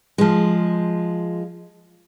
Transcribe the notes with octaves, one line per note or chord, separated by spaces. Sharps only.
F3 G#3